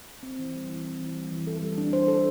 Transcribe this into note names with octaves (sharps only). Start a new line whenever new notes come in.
C4
E3
G3
E3
C4
E3
G3
E3
A4
G3
D4
C5
A4